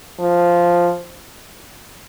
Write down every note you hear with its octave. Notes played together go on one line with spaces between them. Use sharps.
F3